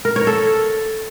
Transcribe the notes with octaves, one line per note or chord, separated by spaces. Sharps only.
A#4
C#5
A4